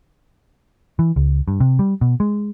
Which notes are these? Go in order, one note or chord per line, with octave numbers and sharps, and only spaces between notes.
E3
C#2
G2
C3
G3
B2
G#3